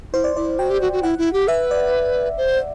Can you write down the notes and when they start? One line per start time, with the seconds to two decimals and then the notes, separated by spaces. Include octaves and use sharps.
0.13 E4 C5
0.24 D5
0.36 E4 D5
0.59 F#4 G5
0.70 G4
0.81 F#4
0.93 F#4
1.03 E4 F#5
1.18 E4
1.33 G4
1.48 B4 E5
1.71 D5
2.38 C5